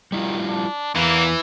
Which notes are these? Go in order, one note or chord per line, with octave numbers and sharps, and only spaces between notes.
D#3 G3 E4 F4
D4
E2 E3 A#3